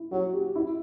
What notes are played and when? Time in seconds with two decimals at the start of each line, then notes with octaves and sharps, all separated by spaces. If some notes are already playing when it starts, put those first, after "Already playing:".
Already playing: E4
0.11 F#3 F#4
0.33 G4
0.55 E4